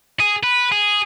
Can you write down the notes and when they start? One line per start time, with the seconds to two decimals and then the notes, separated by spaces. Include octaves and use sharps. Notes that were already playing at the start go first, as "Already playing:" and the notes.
0.20 G#4
0.43 B4
0.72 G#4